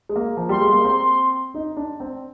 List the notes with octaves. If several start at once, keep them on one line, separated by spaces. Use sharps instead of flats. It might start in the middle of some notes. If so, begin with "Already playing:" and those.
G#3
A#3
F3
G3 C6
G#3
A#3
C4 C6
D#4
D4
C4